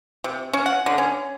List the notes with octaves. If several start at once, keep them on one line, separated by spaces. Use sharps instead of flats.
C3
C#4
F#5
D3
C#4